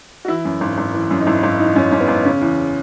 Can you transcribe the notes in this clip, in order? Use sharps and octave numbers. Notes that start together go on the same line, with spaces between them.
F#4
E3 E4
F#2
G#1
G#1
E3
F#2
D#4
G#1 E4
G#1
E3 D#4
F#2 C#4
G#1 C#4
B3
G#1
C#3 C#4
E2